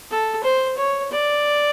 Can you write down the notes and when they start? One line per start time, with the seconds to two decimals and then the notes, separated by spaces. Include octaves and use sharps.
0.11 A4
0.44 C5
0.77 C#5
1.11 D5